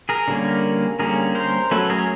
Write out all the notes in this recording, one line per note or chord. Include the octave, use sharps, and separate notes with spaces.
G#4 A#4
D3 G3 A#3 C#4
D3 G3 A#3 C#4 G#4 A#4
A#4 C5
F#3 A3 C#4 A4 B4
G#4 A#4